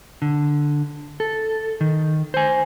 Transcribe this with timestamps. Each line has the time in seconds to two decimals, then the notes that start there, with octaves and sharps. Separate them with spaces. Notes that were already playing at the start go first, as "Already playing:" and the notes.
0.22 D3
1.20 A4
1.81 D#3
2.34 C5 G#5